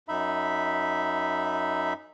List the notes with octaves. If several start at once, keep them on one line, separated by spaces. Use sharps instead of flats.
F#2 D#4 E5 B5